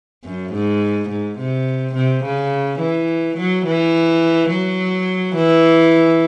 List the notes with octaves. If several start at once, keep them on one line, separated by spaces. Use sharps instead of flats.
F#2
G#2
G#2
C3
C3
C#3
E3
F#3
E3
F#3
E3